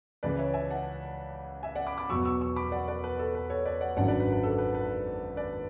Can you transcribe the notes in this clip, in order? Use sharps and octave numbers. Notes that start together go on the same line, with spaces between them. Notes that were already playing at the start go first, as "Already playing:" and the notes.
C#2 C#3 E3 G#3 B4 D5
C#5 E5
E5 G#5
F#5 A5
E5 G#5
D5 F#5
B5 D6
B5 D6
E2 B2 F#3 B3 C#6 E6
C#6 E6
C#6 E6
B5 D6
D5 F#5
B4 D5
B4
A4
B4
A4 C#5
B4 D5
D5 F#5
G#1 F#2 D3 F#3 D5 F#5
B4 D5
B4
B4
A4
B4
B4
B4 D5